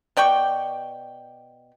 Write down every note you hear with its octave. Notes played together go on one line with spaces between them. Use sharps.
B2 D5 G5 C#6